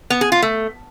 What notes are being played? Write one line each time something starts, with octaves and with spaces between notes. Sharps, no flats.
B3
G#4
F4
A3